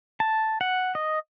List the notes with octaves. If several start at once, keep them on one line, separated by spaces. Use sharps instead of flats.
A5
F#5
D#5